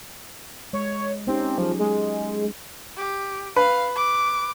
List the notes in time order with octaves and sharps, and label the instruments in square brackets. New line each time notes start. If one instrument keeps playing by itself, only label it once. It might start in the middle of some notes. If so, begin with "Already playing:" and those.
[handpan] G#3 [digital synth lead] C#5
[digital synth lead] C4 [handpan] C#4 D#4 G4
[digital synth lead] F3 [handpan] F#3 G#4
[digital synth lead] G#3
[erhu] G4
[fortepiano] B4 [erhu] F5
[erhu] D6